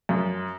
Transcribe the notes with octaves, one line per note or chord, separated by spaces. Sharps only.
F#2